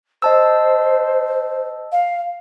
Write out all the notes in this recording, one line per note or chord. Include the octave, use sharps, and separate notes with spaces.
C5 D#5 A5 E6
F5